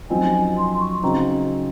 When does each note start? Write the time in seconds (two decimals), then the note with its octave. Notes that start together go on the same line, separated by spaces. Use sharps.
0.09 F#2 F3 C4 D#4 G#5
0.57 C6
0.79 C#6
1.02 C#3 F#3 C4 D#4 A#5